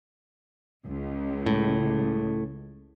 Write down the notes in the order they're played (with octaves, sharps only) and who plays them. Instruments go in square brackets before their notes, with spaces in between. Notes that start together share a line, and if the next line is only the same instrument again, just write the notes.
[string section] C#2
[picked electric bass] A2